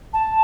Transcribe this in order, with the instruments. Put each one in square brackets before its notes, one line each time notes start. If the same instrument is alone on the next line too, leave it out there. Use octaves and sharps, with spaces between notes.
[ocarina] A5